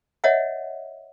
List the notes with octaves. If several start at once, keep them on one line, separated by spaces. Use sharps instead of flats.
C#5 D#5 E5 F#5